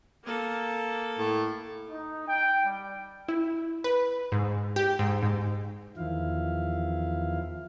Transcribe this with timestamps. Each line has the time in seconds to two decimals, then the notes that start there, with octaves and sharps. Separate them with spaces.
0.24 A#3 A4
1.18 A2
1.90 D#4
2.28 G5
2.65 G3
3.29 E4
3.84 B4
4.32 G#2
4.76 G4
4.99 G#2
5.23 G#2
5.97 E2 D#3 F3 E4 F5